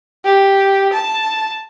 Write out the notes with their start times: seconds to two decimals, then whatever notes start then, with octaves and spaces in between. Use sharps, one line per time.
0.25 G4
0.93 A5